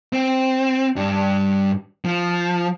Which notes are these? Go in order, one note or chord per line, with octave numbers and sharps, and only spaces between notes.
C4
G2 D4
F3